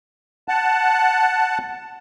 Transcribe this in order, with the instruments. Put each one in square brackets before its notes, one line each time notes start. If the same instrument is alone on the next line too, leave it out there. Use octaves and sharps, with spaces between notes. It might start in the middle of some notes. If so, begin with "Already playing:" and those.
[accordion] F#5 A5